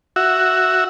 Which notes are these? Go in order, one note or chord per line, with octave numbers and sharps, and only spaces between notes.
F#4 E5